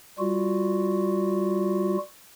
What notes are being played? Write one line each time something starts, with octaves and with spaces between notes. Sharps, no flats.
G3 F4 F#4